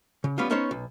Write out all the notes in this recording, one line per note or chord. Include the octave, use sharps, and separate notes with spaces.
C#3
G3 B3 C#4 F4
B3 C#4 D#4 C5 C#5
B1